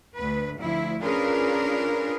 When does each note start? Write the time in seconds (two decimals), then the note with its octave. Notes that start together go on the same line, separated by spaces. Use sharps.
0.16 D2 B4
0.59 D2 F3 E4
1.01 C#4 D4 F4 G#4 A#4 B4